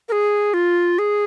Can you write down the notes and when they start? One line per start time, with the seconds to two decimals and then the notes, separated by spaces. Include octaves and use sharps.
0.09 A#4
0.12 G#4
0.54 F4
0.99 G#4